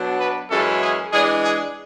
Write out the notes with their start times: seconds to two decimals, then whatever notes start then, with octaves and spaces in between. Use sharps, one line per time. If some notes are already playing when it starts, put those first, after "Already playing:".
Already playing: B2 F#3 B3 D4
0.19 B4
0.49 F#2 E3 G#3 C#4 E4 A4
0.81 G#4
1.11 E3 G#3 D4 G#4
1.43 G#4